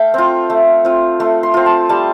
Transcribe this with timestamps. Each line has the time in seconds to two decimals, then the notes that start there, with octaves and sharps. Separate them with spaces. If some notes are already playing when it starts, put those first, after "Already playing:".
Already playing: A3 F5 G5
0.14 C4 F4
0.50 A3
0.85 C4 F4
1.20 A3 C6
1.43 C6
1.54 C4 F4
1.66 A5
1.89 G3 A5